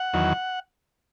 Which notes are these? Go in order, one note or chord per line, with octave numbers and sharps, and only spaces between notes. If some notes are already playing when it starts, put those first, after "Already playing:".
Already playing: F#5
E2 D#3 F#3